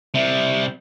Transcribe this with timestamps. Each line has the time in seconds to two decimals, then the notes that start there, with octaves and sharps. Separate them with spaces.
0.14 C3 G3 E5